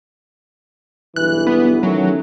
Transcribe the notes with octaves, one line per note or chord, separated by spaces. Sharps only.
B1 G2 E3 F#6
B3
D#3 F#3 A3 C#4